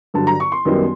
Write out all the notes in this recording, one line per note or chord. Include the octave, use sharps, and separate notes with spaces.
G2 D3 F#3 A5
A#5
C#6
C6
F#2 D#3 G3 B3 D#4